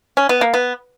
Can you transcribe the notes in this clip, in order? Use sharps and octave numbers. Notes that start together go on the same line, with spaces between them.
C#4
B3
A#3
B3